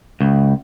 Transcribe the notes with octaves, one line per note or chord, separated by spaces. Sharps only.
C#2